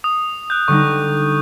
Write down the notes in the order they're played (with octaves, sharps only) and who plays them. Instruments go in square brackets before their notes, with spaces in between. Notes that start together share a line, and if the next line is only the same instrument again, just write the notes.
[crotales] D#6
F#6 G6
[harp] D3 G3 D#4 [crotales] C#6